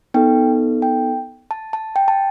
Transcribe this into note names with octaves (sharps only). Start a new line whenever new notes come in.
B3 D#4 A4 G5
G5
A5
A5
G5
A5